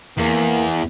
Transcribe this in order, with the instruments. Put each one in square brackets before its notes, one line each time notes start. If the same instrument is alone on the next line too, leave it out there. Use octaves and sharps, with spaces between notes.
[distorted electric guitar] E2 [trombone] A#3